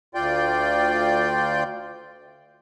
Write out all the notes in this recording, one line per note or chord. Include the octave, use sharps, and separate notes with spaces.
D2 F4 D5 G5 C6 G6